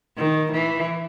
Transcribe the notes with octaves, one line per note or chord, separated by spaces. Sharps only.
D#3
E3